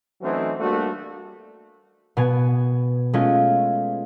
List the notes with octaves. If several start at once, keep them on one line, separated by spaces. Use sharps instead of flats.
E3 F#3 A3 C4 C#4 D#4
G3 A3 A#3 D4 F#4
B2 B3 G#5
G#3 A3 C#4 F4